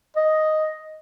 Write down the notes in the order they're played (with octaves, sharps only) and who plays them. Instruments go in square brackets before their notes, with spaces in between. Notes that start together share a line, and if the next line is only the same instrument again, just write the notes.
[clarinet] D#5